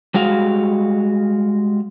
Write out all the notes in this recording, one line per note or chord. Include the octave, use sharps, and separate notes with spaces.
G3 G#3 F#4 F5